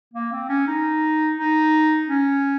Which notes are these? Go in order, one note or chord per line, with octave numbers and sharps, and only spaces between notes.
A#3
C4
C#4
D#4
D#4
C#4